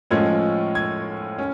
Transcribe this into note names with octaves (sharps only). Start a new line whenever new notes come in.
A2 F3 G#3 C#4 G#6
G#6
C#4